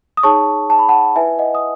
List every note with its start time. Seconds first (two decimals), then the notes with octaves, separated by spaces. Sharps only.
0.17 D#6
0.23 D#4 G#4 C#5 A5 C#6
0.70 A5
0.79 B5
0.89 F#5 A5
1.16 E4 B4 E5 G#5
1.39 D#5 F#5
1.55 D#6